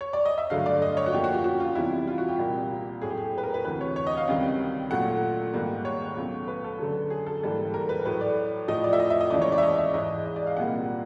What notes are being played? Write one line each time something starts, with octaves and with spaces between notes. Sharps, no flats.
C#5
D5
D#5
E5
G2 D3 F#3 A3 F5
D5
D#5
C#5
F#4
F#2 C#3 F3 A#3 G4
F#4
G4
F#4
F4
E2 C3 E3 G3 E4
E4
F4
F#4
G4
C2 A#2 G3 A#3
A2 F#3 A3 G#4
G4
G#4
B4
A#4
B4
D2 C3 E3 B4
C#5
C#5
D#5
F5
C#2 C3 D#3 G3
A#2 F#3 A3 F#5
G#2 D#3 G3 A#3
C#5
C#2 B2 F#3 A3
B4
A4
F#2 D3 F#3
G#4
A4
G#2 E3 G3 A#3
A#4
B4
A2 F#3 A3 B4
D5
A2 F3 A3 D#5
D5
E5
D#5
E5
D#5
D#2 C#3 E3 G#3 D5
C#5
D5
E5
D#5
E5
G#2 E3 G#3 D#5
D#5
D5
F5
C2 A#2 G3 A#3 F#5